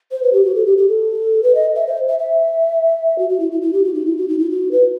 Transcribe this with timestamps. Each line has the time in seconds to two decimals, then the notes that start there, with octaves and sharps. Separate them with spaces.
0.12 C5
0.23 B4
0.33 G4
0.44 F#4
0.55 A4
0.66 G4
0.78 G4
0.88 A4
1.43 B4
1.55 D#5
1.76 E5
1.87 C5
2.09 E5
2.19 E5
3.18 F#4
3.29 F#4
3.40 E4
3.52 E4
3.62 E4
3.73 G4
3.84 F#4
3.94 D#4
4.06 E4
4.17 F#4
4.28 D#4
4.39 E4
4.50 F#4
4.71 B4